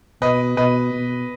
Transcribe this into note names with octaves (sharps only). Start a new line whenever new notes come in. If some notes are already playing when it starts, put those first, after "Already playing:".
B2 B4 D#5
B2 B4 D#5
B2